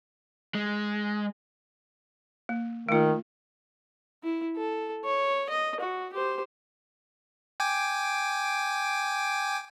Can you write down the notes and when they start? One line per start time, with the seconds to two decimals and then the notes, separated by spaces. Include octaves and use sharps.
0.55 G#3
2.49 A#3
2.89 D#3 A3 F4
4.23 E4
4.57 A4
5.05 C#5
5.50 D#5
5.80 F#4
6.13 G4 C5
7.60 G5 G#5 D6